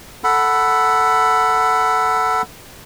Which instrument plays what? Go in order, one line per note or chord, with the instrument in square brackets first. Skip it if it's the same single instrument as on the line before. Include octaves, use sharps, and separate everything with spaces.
[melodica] A4 F#5 B5